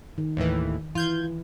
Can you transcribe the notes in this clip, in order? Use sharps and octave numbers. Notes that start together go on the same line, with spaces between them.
D#3
D#2 A2 E3
E3 F4 G6 G#6